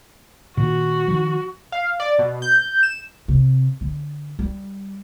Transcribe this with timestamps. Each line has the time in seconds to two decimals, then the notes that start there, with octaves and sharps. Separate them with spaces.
0.57 A#2 D#3 F#4
1.08 D#3 F3
1.72 F5
2.00 D5
2.19 B2
2.42 G6
2.83 E7
3.28 C3
3.81 D3
4.39 G3